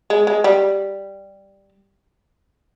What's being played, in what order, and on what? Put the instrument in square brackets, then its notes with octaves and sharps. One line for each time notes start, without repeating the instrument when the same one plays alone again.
[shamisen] G#3
G#3
G3